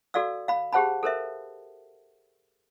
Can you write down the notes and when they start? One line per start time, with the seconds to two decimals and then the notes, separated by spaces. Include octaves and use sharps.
0.14 F#4 A4 D5 F5 E6
0.48 F5 B5
0.73 G4 G#4 C5 F#5 A5 B5
1.03 A4 A#4 C5 E5